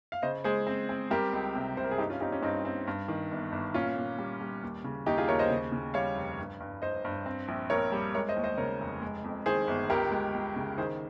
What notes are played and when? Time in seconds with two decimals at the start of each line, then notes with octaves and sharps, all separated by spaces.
0.12 F5
0.22 C#3 C5 D#5
0.44 G#3 G#4 C5
0.67 C4
0.89 C4
1.11 G3 G4 A#4
1.33 C#2
1.55 C3
1.77 C3 C5
1.84 A#4
1.91 G#4
1.98 G2 D#4 G4
2.10 C#4 F4
2.20 C4 D#4 G4
2.32 C#4
2.42 G2 C4 D#4
2.65 C4
2.87 G2
3.08 D#3
3.31 G1
3.52 G1
3.74 A#2 C#4 F4
3.97 A#2
4.18 G3
4.41 G3
4.63 D#2
4.84 C#3
5.06 D#2 D#4 G4
5.17 F4 G#4
5.28 D#2 A#4 C#5
5.39 C5 D#5
5.50 C#3
5.72 C#3
5.94 G3 C#5 F5
6.16 F1
6.38 G2
6.60 G2
6.82 G2 C5 D#5
7.05 G2
7.26 C4
7.48 A#1
7.70 A#1 A#4 C#5
7.92 G3
8.14 G#3 A#4 C#5
8.29 C5 D#5
8.36 D#2
8.44 C5 D#5
8.58 C#3 A#4 C#5
8.80 F1
9.02 G#3
9.24 F2
9.46 D#3 G#4 C5
9.67 G1
9.90 C#2 G4 A#4
10.11 G#3
10.34 C#2
10.56 C#3
10.77 D#3 G#4 C5